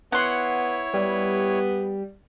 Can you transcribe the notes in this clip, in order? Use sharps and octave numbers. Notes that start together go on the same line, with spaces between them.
B3 E4 C#5 F#5 C6
G3 B3